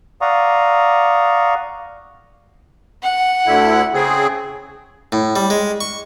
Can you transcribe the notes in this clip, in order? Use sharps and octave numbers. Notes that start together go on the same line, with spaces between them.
D5 F5 F#5 A#5 C#6 D#6
F#5
D2 D3 E4
C#3 C4 G#4
A2
G3
G#3
C#6